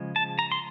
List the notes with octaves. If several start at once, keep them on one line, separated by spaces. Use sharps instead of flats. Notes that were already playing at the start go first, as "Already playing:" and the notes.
Already playing: C#3 F3 G#3
A5
A#5
C6